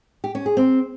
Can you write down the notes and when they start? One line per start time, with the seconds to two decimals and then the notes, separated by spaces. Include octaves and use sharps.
0.24 G4
0.35 C#4
0.46 G#4
0.57 C4